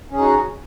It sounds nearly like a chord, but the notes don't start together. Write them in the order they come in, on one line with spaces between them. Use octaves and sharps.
C#4 G#4 D#4 F#4